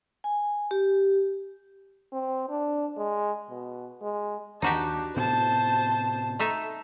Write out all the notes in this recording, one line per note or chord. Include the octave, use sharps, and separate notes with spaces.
G#5
G4
C4
D4
G#3
B2
G#3
D#2 D4 D#4 F#4 G4
A2 C3 B3 C5 A5
A3 D#4 E5